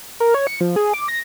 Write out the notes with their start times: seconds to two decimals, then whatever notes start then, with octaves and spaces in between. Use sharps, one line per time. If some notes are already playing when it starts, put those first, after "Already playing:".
0.20 A#4
0.34 C#5
0.47 C#7
0.61 F3
0.76 G#4
0.93 D6
1.08 A#6